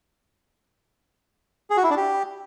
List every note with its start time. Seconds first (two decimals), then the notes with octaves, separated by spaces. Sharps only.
1.70 G#4
1.77 F#4
1.84 E4
1.90 D4
1.97 G4